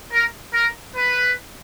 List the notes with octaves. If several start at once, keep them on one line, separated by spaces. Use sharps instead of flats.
A#4
A#4
B4